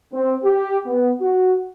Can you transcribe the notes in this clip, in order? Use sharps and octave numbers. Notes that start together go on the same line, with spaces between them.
C4
G4
B3
F#4